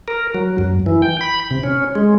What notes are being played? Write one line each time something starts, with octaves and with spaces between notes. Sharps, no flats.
A#4
F#3
F#2
E3
G5
B5
C3
C#4
G#3